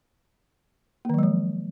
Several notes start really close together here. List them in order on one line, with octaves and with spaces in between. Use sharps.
A#3 D#3 F#3 G#3 F3